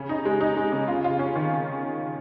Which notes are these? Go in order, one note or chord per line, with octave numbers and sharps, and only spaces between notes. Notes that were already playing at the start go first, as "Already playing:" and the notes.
Already playing: C#3
D#4
G#3
D#4
G#3
C#3
F4
F4
C#4
D#3